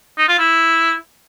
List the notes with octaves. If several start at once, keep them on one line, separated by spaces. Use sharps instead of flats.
D#4
F4
E4